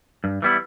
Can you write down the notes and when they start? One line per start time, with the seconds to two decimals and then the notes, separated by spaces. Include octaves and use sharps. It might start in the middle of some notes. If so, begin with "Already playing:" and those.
0.24 G2
0.42 E3 G3 B3 E4